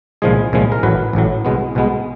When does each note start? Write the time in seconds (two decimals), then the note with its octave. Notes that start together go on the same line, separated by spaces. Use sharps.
0.22 C2 A#2 F3 G#3 G#4
0.53 C2 A#2 F3 G#3
0.72 A#4
0.83 A1 A2 F#3 B4
1.13 A1 A2 F#3
1.45 C2 B2 G#3 B3
1.75 C2 B2 G#3 B3